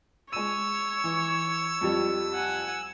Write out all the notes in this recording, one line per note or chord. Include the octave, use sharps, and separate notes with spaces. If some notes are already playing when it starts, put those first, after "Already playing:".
G#3 C#5 E6 D#7
E3
F2 G3
F#5 G#5